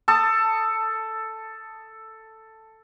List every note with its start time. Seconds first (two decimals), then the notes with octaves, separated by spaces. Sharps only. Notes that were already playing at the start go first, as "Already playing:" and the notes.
0.08 A4 A5 D#6